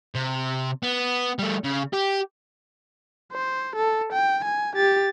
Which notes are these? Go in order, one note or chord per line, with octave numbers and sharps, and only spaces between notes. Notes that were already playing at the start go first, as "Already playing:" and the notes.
C3
B3
G3 A3
C#3
G4
C5
A4
G5
G#5
G4 A6